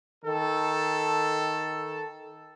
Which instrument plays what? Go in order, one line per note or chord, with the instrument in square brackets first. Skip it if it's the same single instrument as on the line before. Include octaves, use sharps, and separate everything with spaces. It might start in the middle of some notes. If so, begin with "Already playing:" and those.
[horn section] D#3 A4